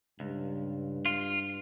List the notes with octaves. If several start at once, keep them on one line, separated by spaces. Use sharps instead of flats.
C#2 G2
F4